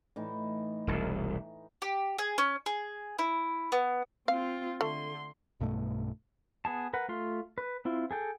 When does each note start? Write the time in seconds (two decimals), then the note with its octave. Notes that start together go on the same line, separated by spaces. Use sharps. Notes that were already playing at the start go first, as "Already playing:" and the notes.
0.16 A2 E3 D#4
0.87 E1 C2
1.82 G4
2.18 G#4
2.38 C#4
2.66 G#4
3.19 E4
3.72 B3
4.28 C4 F4 F5
4.81 D3 A3 C6
5.60 B1 G2 B2 A3
6.65 B3 G#4 A5
6.93 A#4 B4 F#5
7.09 A3 F4 C6
7.58 B4
7.85 C4 E4 F4
8.11 G#4 A4 G5